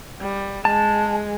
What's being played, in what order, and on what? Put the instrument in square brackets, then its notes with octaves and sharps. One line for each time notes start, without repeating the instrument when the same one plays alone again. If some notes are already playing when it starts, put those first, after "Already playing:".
[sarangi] G3
[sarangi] G#3 [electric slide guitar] A5